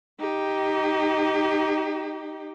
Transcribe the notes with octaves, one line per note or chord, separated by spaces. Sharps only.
D#4 G4